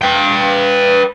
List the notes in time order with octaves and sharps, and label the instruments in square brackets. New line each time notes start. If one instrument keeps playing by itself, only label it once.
[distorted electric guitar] B4 G5